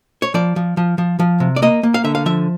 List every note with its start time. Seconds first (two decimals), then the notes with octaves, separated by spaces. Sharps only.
0.22 C#5
0.34 F3 D5
0.56 F3
0.77 F3
0.98 F3
1.19 F3
1.40 C3
1.56 D5
1.62 A#3 D#5
1.83 A#3
1.94 F5
2.04 D3 E5
2.15 F5
2.26 F3 E5